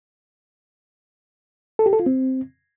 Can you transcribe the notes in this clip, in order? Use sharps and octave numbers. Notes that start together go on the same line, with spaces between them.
A4
G4
A4
F4
C4